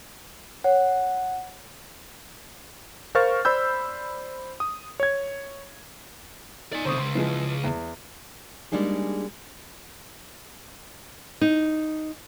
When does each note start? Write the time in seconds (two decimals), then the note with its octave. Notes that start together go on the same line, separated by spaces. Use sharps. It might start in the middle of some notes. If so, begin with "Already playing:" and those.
0.64 C#5 F#5
3.15 A#4 C5 F5 C#6 F6 A6
3.45 C5 D5 B5 E6 G6
4.60 D#6
5.00 C#5 G#6
6.73 D#4 D5 G#5
6.85 D2 C3 C5 C#6 D#6
6.98 C#2 C6
7.15 E3 F3 G#3
7.64 E2
8.72 G3 G#3 A#3 D4 D#4 G#4
11.41 D#4